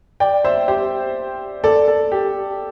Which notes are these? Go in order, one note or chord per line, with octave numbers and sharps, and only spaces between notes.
D5 G5
C5 E5
G4 C5
A4 D5
A4
G4